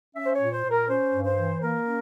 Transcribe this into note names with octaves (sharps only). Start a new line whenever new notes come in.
C#4 E5
C5
C#5
A#2
C5
A#2
A#4
C#4 C5
G2
C5
E3
A#3 A#4
C#4